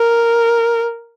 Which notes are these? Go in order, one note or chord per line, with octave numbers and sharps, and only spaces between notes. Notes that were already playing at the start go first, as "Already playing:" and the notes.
Already playing: A#4